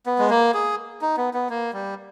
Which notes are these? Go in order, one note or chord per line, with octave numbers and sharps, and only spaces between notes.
B3
G#3
A#3
G#4
D#4
B3
B3
A#3
G3